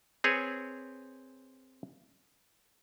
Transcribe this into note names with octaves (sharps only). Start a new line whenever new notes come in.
C4 G#4 B4 C#5